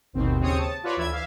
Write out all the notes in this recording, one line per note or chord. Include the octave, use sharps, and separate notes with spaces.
G#1 D#2 B2 C4
D#2 C#3 C4 C#5 D#6 C#7
A5
F4 F#4 B4 C#5 D5
D2 E3 E5 E6 G#6
E5 F5